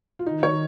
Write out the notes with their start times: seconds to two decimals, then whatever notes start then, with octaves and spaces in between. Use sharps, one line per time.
0.19 F4
0.26 D#3 D#4
0.43 C#5